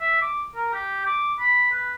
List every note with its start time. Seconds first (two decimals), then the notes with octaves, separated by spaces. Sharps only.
0.01 E5
0.22 D6
0.56 A#4
0.74 G4
1.06 D6
1.40 B5
1.72 B4